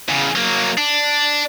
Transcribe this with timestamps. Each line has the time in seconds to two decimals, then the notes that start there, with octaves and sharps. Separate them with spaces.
0.09 E2 C#3
0.36 F#3 A#3
0.78 D4